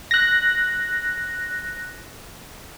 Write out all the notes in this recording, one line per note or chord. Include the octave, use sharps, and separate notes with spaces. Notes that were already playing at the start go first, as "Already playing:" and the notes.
F#6 A#6